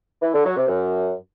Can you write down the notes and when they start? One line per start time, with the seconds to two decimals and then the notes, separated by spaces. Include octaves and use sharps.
0.22 E3
0.33 D3
0.45 F#3
0.56 C3
0.68 F#2